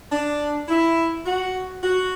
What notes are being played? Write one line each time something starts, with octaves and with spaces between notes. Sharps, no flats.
D4
E4
F#4
F#4